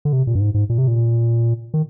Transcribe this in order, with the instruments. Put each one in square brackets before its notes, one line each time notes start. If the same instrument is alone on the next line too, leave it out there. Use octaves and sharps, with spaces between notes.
[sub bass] D3
C3
A#2
G2
G#2
G#2
A#2
C3
A#2
D#3